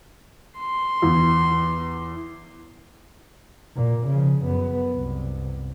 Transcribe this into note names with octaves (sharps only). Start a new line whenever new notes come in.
C6
E2
A#2
C#3 F3
F#2 B3
C2